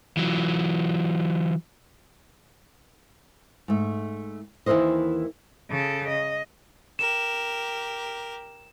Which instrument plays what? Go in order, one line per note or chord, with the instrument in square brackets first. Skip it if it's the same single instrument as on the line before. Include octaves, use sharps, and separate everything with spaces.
[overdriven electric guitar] E3 F#3
[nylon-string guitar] G#2 A3
D#2 E3 E4 A#4 C5 D#5
[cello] C#3 A4
D#5
[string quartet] G4 A#4 [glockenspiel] E7